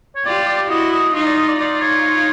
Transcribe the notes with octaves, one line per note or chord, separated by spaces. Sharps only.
C#5
F4 G4 D5
D5
E4 F#4 D#5
D#5
D#4 F4 D#5
D5
D#5
D5
D#4 F4 D5
C#5